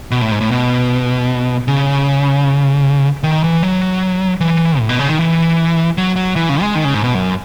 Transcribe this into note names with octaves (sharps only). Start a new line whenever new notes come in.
B2
A2
G#2
A2
B2
C#3
D#3
E3
F#3
E3
A2
B2
C#3
D#3
E3
F#3
F#3
E3
C#3
G#3
D#3
C#3
G#2
B2
F#2